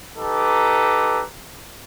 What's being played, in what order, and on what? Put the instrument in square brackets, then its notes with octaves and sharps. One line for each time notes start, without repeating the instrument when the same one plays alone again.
[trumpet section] D#4 G4 A4 B4 A#5 D6